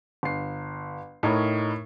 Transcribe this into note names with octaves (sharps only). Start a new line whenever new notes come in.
G1 C7
A2 D#4 A#4 C#5 B5